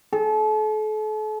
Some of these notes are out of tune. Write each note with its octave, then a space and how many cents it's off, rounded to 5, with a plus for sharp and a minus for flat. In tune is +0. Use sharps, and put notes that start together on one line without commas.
A4 -40